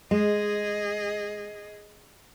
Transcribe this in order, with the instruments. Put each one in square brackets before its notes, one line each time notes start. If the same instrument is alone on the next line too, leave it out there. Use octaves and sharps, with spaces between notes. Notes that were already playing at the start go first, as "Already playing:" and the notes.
[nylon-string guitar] G#3 [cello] G#4 D#5